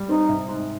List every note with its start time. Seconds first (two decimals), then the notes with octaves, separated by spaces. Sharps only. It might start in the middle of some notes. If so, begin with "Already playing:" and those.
Already playing: G3
0.09 C4 D#4
0.29 C3
0.49 G#2